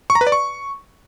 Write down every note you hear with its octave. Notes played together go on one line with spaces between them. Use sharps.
C#6
A#5
B4
D5
C#6